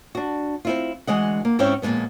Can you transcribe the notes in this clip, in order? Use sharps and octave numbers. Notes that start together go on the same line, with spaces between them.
D4 F#4
C4 E4 F4
D2 E3 G#3 D#5 F#5
A#3
G#2 C4 C#4 E4 C#5 G5
F2 A#2 F3 G#3 B3